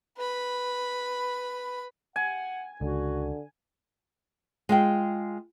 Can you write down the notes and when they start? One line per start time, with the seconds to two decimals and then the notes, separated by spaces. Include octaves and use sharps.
0.18 B4 B5
2.16 F#5 G#5
2.81 C#2 D3 F#4
4.69 G#3 F4 G5